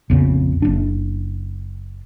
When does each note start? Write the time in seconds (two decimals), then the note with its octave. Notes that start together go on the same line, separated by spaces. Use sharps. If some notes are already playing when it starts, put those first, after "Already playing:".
0.10 A#1 F2 C#3 B3
0.62 F#1 D4